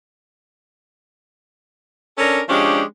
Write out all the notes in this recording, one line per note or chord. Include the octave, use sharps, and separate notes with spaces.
C#4 D4 A4 A#4
F3 G#3 C#4 D4 G4